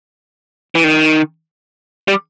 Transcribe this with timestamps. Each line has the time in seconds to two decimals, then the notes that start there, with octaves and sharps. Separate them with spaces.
0.75 E3
0.84 D#3
2.08 G3